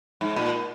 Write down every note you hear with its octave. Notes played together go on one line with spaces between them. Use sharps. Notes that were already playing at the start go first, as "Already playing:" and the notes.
G#2
A#2